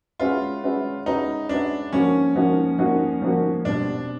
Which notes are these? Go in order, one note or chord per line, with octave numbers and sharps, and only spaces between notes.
G#3 C#4 F4 F#4 B4 E5
G#3 C#4 F#4 B4 E5
G#3 C#4 D#4 F#4 B4 E5
G#3 C#4 D4 F#4 B4 E5
F3 A#3 C#4 D#4 F#4
F3 A#3 D#4 F#4
F3 A#3 D#4 F#4
F3 A#3 D#4 F#4
B2 G3 C4 D4